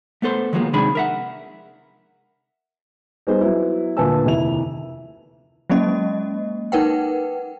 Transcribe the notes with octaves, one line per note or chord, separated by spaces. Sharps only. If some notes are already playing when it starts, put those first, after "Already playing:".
A3 B3 A4 C5
D#3 F3 F#3 G#3 A#3 B3
C3 D#3 G#3 D4 G#4 B5
A#4 E5 F#5
G3 B3 D#4 G#4 C5
F#3 B3 E4
D2 A#2 B4 G#5 A5 E6
F1 D#2 E4 F7
F#3 G#3 A#3 C#4 D#5
D#4 A#4 B4 F#5 G5